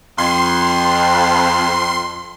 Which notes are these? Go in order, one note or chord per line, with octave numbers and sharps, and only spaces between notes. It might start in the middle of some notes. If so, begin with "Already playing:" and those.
F2 C6